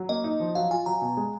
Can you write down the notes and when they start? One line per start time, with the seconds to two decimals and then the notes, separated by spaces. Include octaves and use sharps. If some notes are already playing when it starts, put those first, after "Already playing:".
Already playing: F#3
0.09 A#3 D#5
0.24 D#4
0.40 F3
0.55 F#3 F5
0.71 F4 G#5
0.86 F#3 A#5
1.02 B2
1.17 G#3